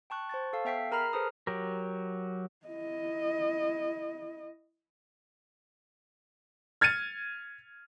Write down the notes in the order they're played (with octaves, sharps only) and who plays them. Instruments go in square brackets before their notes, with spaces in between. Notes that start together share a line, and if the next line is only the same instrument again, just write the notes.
[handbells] G5 A5 C#6 F#6
C5 A5 C#6 A6
A4 F5 A5
B3 E5 G5 B6 C7
G#4 A#4 A#5 B5 F6 C7
G#4 A4 B4 C5 A5 D#6
[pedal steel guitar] F#3 G4 A#4
[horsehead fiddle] E4 D#5
[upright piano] F6 G#6 A6 C#7 D#7